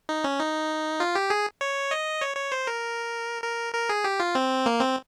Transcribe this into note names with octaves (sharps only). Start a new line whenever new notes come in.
D#4
C#4
D#4
F4
G4
G#4
C#5
D#5
C#5
C#5
C5
A#4
A#4
A#4
G#4
G4
F4
C4
A#3
C4